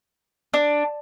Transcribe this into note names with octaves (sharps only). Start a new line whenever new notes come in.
D4